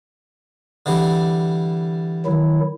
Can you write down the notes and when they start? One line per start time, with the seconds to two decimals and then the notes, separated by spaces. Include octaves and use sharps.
0.86 D3 E3 G3
2.26 D#3 F#3 E4